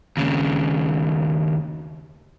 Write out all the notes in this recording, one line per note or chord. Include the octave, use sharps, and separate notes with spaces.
D#2 C#3